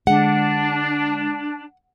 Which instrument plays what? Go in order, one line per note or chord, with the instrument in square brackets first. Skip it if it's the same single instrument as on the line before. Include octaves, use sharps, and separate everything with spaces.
[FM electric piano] D3 G#3 [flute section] D4 [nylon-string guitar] F#5